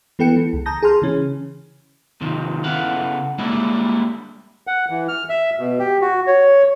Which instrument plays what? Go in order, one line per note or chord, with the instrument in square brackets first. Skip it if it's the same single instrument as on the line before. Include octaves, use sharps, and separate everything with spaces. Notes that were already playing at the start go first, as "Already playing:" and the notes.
[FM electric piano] E3 B3 A4 G5 C#7
E3
C#2
A5 A#5 D#6 G6 A#6
G#4 G#5 C6 F6
C#3 E3 C#4
[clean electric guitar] C3 D#3 F3
C#3 B3 E4 A4 F5 F#5
G3 G#3 A#3 D4 E4
[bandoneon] F#5
E3
F6
E5
B2
G4
F#4
C#5